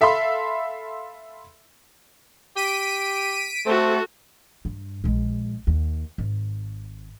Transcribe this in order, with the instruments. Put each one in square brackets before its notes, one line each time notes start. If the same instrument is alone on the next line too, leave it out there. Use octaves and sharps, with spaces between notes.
[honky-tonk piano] A4 E5 F5 B5 C6
[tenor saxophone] G4 [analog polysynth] B6 D7 D#7
[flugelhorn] A3 [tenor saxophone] C4 [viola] F#4 A4
[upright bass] G2
A#1 G#3
D#2
G#1